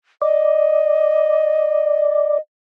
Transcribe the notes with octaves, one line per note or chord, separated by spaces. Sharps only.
D5 D#5